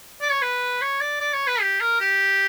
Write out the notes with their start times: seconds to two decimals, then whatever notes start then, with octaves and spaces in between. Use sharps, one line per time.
0.22 D5
0.31 C#5
0.42 B4
0.82 C#5
1.01 D5
1.21 D5
1.34 C#5
1.47 B4
1.61 G4
1.81 A#4
2.01 G4